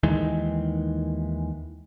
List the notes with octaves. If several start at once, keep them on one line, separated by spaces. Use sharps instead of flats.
D#2 D#3 E3 G#3